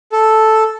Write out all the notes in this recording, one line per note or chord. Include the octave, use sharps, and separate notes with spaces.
A4